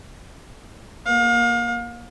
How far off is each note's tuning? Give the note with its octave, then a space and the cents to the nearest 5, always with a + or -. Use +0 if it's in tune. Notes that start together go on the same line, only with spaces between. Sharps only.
A#3 +15 F5 +35